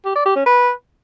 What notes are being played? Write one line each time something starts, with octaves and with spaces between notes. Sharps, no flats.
G4
D5
G4
C#4
B4